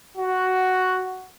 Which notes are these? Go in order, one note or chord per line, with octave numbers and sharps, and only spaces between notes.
F#4